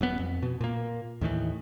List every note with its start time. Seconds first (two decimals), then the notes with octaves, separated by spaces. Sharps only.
0.01 D#1 F#2 B3
0.19 F2
0.43 B2
0.61 A#2 A#3
1.21 D#2 A2 D#3 E3